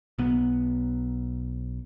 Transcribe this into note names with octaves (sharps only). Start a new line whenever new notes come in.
B1 B3